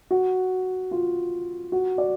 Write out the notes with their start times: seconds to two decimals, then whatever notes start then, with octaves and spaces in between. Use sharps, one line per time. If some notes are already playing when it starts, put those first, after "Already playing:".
0.11 F#4
0.91 F4
1.72 F#4
1.98 D5